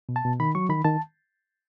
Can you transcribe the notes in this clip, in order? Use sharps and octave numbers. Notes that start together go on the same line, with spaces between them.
B2
A5
B2
D#3 B5
F#3 C#6
D#3 B5
D#3 A5